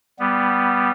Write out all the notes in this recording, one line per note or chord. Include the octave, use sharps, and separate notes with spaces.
G3 B3